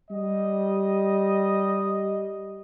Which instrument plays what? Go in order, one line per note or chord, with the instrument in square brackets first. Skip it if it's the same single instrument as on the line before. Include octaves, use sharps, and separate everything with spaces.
[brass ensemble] G3 D#5